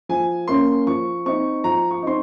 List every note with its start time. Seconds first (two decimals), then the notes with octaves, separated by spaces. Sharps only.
0.09 F3 G#5
0.48 A#3 C#4 C6
0.87 F3 C#6
1.26 C4 D#4 C#6
1.64 F3 A#5
1.91 C#6
2.02 C4 D#4 C6